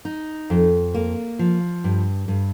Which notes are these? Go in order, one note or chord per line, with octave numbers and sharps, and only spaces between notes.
D#4
F2
A#3
F3
G2
G2